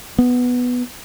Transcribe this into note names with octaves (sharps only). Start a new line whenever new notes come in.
B3